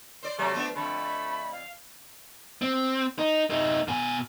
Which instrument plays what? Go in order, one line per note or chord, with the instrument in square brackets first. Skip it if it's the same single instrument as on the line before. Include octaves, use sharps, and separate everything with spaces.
[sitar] C5 D5
[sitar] C3 F#3 [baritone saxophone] A3 [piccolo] D6
[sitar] F3 B3 D4
[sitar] F2 D3 [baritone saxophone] A3 [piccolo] B5
[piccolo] F5
[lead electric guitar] C4
D#4
A3 D#4
B2 G#5